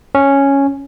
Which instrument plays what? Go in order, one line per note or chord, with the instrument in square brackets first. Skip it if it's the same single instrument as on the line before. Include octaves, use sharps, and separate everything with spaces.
[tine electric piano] C#4